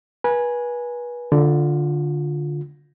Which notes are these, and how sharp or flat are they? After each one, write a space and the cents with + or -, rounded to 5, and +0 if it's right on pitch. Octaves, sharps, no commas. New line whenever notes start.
B4 -30 G#5 +0
D3 +0 F4 +15